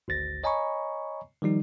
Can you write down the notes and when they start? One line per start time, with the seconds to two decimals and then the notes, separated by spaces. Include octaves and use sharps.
0.08 G#1 D2 A6 A#6
0.44 C#5 D#5 G#5 A#5 B5 C#6
1.42 D#3 F3 G3 D#4